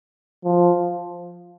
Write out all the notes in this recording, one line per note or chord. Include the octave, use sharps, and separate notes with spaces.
F3